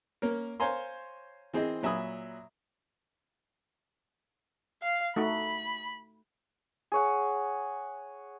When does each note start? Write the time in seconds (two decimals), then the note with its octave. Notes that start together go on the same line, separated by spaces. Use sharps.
0.22 A#3 C#4 A#4
0.60 C5 C#5 F5 G#5 A#5 C6
1.54 E3 C4 G#4 C5 D#5
1.83 A#2 F#3 E5 G#5 B5 D#6
4.82 F5
5.16 A3 D#4 F#4 B5
6.92 G#4 C#5 F#5